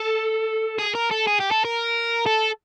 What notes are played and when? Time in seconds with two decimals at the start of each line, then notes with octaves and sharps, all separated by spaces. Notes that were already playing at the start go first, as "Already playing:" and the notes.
Already playing: A4
0.79 G#4
0.95 A#4
1.11 A4
1.27 G#4
1.40 G4
1.51 A4
1.65 A#4
2.26 A4